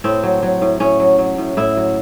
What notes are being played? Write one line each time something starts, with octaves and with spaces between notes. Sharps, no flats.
A2 C4
F#3
F#3
A2
A2 C#4
F#3
F#3
A2
A2 E4
F#3